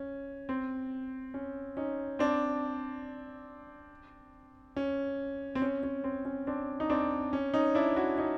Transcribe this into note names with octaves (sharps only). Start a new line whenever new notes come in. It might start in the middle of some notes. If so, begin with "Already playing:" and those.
Already playing: C#4
C4
C#4
C#4 D#4
C4 D4
C#4
C4
C#4
C#4
C4
C#4
C4 D4
D#4
C4 D4
C#4
C#4 D#4
D4 E4
E4 F#4
C#4 D#4